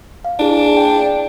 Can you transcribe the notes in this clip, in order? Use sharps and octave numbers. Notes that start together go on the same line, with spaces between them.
F5
D4 E4 G#4
G5